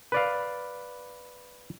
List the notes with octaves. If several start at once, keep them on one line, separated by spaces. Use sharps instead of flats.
B4 D5 F5